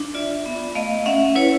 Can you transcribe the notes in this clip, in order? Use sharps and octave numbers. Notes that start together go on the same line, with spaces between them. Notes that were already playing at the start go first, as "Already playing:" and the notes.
Already playing: D4
F4 D5 E5
B3
A3 D#5 F5
C#4 E5 F#5
E4 B4 C#5